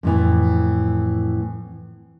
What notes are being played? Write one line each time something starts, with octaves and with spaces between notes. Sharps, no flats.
F2 A2 E3